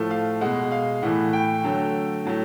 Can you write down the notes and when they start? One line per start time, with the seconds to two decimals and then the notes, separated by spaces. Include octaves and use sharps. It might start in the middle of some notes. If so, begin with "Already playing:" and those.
Already playing: A2 F3 A3
0.11 F5
0.41 B2 G#3 F#5
0.72 F5
1.02 A2 E3 A3 F#5
1.33 G5
1.63 D3 F#3 A3
2.25 A2 F#3 A3